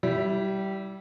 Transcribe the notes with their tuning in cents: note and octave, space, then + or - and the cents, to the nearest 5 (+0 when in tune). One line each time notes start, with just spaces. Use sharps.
G3 -20 E4 +0